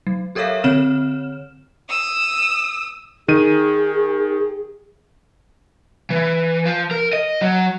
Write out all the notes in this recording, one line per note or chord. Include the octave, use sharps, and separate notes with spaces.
F#3
G4 A4 A#4 C#5 E5 F5
D3 C4 C#5 F6 E7
D#6 E6
D#3 G#4 D#7
E3
F3
A#4
D#5
F#3